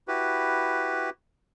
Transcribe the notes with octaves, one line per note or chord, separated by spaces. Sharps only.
E4 F#4 G4 B4